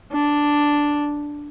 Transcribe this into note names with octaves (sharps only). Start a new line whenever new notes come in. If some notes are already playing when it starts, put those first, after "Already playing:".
D4